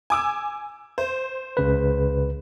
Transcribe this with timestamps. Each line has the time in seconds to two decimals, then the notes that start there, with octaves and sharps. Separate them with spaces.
0.10 G#5 D6 E6
0.98 C5
1.57 C#2 C#3 B4